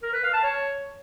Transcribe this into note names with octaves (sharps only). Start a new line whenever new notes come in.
A#4
B4
F5
A5
C#5